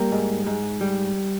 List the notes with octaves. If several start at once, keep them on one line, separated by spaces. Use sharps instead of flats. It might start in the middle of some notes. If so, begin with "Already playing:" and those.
Already playing: G3 A#3 A#4
G#2
G#2
G3